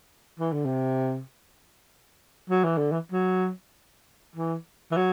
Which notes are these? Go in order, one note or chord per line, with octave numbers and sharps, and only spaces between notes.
E3
D3
C3
F#3
E3
D3
E3
F#3
E3
E3
F#3